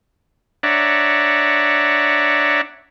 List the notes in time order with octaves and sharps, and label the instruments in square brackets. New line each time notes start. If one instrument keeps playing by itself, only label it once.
[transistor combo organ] D4 C#5 D5 E5 F#5 A#5